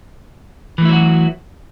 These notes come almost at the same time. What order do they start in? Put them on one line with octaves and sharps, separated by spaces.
E3 A3 E4 F#3 F#4